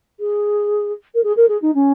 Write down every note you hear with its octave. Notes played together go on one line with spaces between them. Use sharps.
G#4
A#4
G#4
A#4
G#4
D#4
C#4